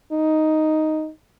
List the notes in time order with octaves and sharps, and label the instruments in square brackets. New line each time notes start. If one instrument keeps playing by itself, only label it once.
[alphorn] D#4